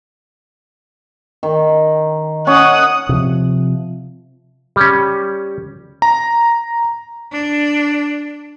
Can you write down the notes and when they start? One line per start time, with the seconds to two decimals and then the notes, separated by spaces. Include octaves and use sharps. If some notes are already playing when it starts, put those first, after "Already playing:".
1.43 D#3
2.47 C#4 F#5 D#6
3.09 C3 F3
4.76 G3 C#4
6.02 A#5
7.32 D4